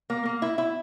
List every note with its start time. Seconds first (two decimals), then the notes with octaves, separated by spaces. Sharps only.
0.10 A#3
0.25 A#3
0.42 E4
0.58 E4